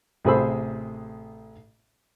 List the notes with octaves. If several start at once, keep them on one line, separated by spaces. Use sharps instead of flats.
A1 C3 G#4 C5 B5 E6